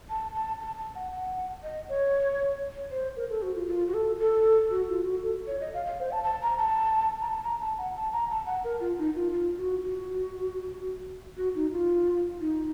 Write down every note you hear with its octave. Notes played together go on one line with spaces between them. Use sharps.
A5
A5
A5
A5
F#5
F#5
D#5
C#5
C5
A#4
A4
F#4
F4
F4
F#4
A4
A4
F#4
F4
F#4
A4
C#5
D#5
F5
F5
C5
A5
A5
A#5
A5
A#5
A5
A#5
A5
F#5
A5
A#5
A5
F#5
A#4
F4
D#4
F4
F4
F#4
F#4
F#4
D#4
F4
D#4